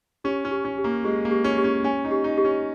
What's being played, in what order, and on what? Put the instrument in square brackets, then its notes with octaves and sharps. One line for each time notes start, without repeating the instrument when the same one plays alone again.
[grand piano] C#4 [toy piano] G4
[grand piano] C#4
[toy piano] G4
[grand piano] C#4
[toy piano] G4
[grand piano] A#3
[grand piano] G#3 [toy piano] G4
[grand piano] A#3
[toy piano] G4
[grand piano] C#4
[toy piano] G4
[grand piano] C#4
[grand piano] C#4 [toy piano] G#5
[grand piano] D#4
[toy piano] G4
[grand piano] D#4
[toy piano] G4
[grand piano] C#4